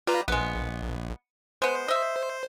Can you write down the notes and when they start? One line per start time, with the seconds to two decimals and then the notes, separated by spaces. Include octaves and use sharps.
0.07 G3 F4 B4 A#5
0.28 A#1 G#3 B3
1.62 G#3 B3 C5
1.88 D#5 E5